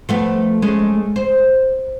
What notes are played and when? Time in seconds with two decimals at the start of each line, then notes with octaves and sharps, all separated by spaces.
0.09 F3 A3 B3
0.62 G#3 A3 C#4
1.16 C5